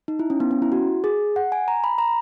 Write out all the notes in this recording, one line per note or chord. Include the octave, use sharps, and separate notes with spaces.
D#4
E4
C#4
B3
C#4
E4
F#4
G#4
F#5
G#5
A#5
B5
A#5